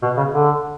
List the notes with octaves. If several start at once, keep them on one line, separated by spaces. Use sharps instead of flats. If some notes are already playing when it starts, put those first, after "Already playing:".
B2
C#3
D3